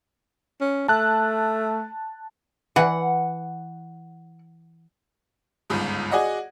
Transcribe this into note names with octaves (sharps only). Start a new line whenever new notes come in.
C#4
A3 A5 F#6
E3 F#5
G1 C#2 G#2
F#4 G#4 D5 D#5 F#5